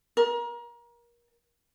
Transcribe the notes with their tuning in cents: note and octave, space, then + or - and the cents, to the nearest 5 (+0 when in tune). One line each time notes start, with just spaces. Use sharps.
A#4 +30